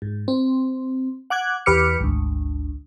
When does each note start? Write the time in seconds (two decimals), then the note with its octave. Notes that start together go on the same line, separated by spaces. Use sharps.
0.02 G#2
0.28 C4
1.30 F#5 D6 F#6 G#6
1.66 E2 G4 B4 D6 F6 C#7
2.00 G#1 D2